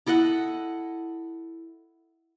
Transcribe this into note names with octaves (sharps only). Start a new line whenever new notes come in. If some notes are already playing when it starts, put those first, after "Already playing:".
E4 A4 D#5 F#5